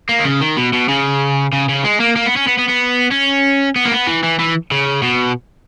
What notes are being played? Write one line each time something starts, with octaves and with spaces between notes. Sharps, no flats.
A#3
D#3
C#3
D#3
B2
B2
C#3
C#3
C#3
G#3
A#3
A#3
B3
C#4
B3
B3
B3
C#4
B3
A#3
B3
E3
E3
E3
C#3
B2